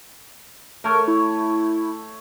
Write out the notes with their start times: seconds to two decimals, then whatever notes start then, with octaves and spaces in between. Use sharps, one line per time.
0.84 A3 A#4 C#5
1.08 E4